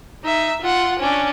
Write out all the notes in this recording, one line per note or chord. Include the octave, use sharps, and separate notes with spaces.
D#4 E5
F4 F#5
C#4 D4